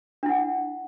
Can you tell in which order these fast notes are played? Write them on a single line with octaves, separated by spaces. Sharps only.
D4 E4 F#5